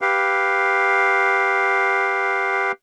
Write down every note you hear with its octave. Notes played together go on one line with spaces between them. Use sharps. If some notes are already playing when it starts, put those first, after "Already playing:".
G4 B4 F5